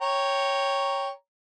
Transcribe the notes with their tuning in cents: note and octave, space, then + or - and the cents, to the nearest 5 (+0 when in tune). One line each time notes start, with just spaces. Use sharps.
C#5 +0 G5 +0 A#5 +0